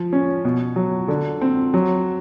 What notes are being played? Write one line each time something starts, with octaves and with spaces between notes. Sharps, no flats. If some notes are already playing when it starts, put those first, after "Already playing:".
Already playing: F3
C#4
B2
F#3
D3
C4
F#3